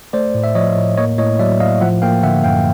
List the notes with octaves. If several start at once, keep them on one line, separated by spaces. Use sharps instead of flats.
A3 C5 D5
A2
E5
F3 C#5 D#5
A2
A#3 C#5 D#5
A2 C#5 D#5
F#3 D5 E5
A2 D#5 F5
F3 E5 F#5
A#3 F5 G5
D3 E5 F#5
F#2 F5 G5